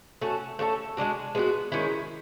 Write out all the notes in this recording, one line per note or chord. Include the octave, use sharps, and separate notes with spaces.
A3 C#4 F#4 A4
A3 C#4 F#4 A4
G#3 B3 D4 F#4
G#3 B3 D4 F#4
D#3 G#3 C#4 E4